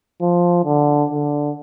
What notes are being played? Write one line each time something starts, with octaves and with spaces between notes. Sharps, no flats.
F3
D3
D3